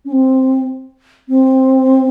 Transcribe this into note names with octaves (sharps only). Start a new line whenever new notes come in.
C#4
C4
C4